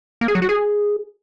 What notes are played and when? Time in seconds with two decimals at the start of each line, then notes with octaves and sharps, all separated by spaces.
0.21 A#3
0.28 G#4
0.35 F#3
0.42 F#4
0.49 G#4